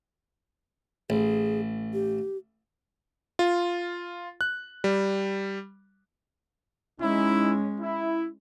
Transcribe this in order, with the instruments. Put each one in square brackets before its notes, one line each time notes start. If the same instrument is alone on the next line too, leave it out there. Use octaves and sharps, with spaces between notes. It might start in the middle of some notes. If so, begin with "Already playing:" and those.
[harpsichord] A1 [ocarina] G#4
[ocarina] G4
[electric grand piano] F4
F#6
G3
[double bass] G#3 C#4 [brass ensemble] D#4 E4
[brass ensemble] E4